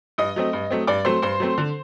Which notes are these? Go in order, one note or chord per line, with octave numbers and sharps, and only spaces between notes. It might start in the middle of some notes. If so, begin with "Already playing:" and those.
G2 D#5 D#6
F#3 A3 C4
G2
F#3 A3 C4
G2 D5 D6
F#3 A3 C4 C5 C6
G2 C5 C6
F#3 A3 C4
D3